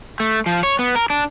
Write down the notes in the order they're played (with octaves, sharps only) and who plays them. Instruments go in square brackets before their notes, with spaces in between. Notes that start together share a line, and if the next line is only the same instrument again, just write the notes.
[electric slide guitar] A3
F3
C#5
B3
A#4
D4